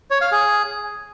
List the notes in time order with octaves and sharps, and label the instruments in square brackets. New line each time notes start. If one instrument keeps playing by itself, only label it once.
[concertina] C#5
F5
G#4